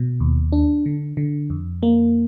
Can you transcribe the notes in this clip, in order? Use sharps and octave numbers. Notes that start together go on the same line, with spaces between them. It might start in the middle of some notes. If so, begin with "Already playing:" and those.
Already playing: B2
D#2
D4
D3
D3
F2
A#3